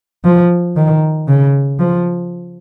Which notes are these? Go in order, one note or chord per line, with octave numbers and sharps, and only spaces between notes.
F3
D#3
C#3
F3